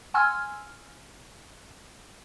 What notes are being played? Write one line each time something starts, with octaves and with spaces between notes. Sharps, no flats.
F#5 G#5 C6 E6 F6 G#6